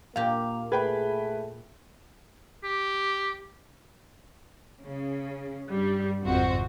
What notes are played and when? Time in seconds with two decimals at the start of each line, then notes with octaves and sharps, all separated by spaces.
0.16 A#2 A#3 G4 F5
0.72 A3 G#4 B4 G5 B5
2.64 G4
4.84 C#3
5.72 G2 G3
6.25 G#1 F2 C3 C4 F#4 C5